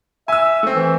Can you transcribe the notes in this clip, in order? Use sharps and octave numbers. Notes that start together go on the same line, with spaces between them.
E5 G#5 E6
A3 C4
E3